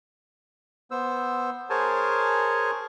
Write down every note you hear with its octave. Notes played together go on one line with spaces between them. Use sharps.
B3 C5 E6
G#4 A#4 C5 C#5 G#5 A5